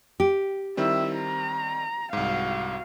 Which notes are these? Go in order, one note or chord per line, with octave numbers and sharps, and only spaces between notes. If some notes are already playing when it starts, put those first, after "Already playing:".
G4
D#3 G3 C4 E4 E5
A#5
C2 G#2 F#4 F5